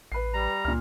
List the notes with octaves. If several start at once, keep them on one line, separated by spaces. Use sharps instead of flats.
A1 B4 C7
G3 A#5
C#2 A#2 F6